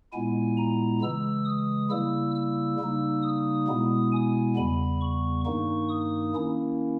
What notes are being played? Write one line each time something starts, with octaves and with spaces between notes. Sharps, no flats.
A#2 G#3 B3 E4 G#5
A#5
C#3 E3 G#3 E6
D#6
C#3 G3 A#3 E4 E6
E6
C#3 G3 A#3 D#4
D#6
B2 G#3 B3 E4
G#5
E2 C#3 G3 B3 B5
C#6
G2 D#3 A#3 D#4 C#6
D#6
D#3 A#3 C#4 E4